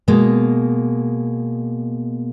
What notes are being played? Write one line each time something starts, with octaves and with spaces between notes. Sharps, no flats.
B2 G#3 A#3